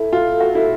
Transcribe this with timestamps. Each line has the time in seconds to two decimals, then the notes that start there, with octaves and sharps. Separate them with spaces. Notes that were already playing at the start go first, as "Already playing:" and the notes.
Already playing: E4 A4
0.13 F4
0.40 F#4
0.55 E4